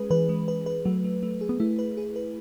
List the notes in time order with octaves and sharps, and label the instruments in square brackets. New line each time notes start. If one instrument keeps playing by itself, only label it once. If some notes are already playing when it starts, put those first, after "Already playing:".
Already playing: [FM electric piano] G#3 C#4 G#4 B4
[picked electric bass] E3 [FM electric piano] B4
[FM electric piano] G#3
B4
B4
[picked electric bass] F#3 [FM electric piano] A3
[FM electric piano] A3
A3
G#4
[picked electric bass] B3
[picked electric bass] A3 [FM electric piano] E4
[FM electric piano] B4
G#4
B4